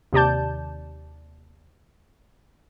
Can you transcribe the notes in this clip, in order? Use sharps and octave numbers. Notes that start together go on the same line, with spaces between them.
D#2 C3 G4 D5 A5 G6